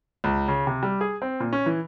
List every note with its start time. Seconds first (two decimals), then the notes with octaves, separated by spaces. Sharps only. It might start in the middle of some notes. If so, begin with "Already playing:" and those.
0.24 C#2
0.48 C#3
0.67 C3
0.83 G3
1.01 G#4
1.22 C4
1.40 A#2
1.53 C#4
1.66 E3